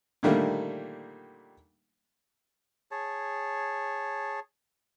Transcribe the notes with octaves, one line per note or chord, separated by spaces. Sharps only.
A#2 D3 D#3 G3 A3 A#3
G#4 C#5 A5